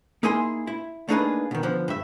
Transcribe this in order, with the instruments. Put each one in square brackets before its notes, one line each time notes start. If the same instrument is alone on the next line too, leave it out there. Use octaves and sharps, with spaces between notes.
[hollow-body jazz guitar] A#3 D#4 E4 G#4 G#5 C6
E4
A3 A#3 D4 D#4 G#4 B4
B2 D#3
D3 F3 B3
G2 E5